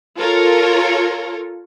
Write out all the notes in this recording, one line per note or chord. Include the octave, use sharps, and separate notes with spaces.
F4 A4 A#4 C#5